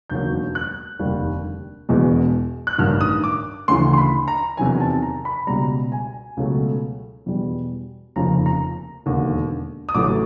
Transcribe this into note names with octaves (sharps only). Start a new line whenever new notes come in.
E1 D#2 D#3 F#3 G6
F#6
F1 D#2 D3 G3
E1 E2 B2 G#3
F#6
A1 G2 D#3 F6
D#6
D6
D2 C#3 E3 C6
C6
B5
A#5
E2 C3 D#3 F#3 G#5
A5
A#5
B5
C#2 B2 G3 A#5
G#5
C#2 B2 F#3 A3
E2 B2 G3
F1 D#2 C#3 F3 A#5
A#5
E1 D#2 D3
D#6
A1 A2 F#3 A3 D6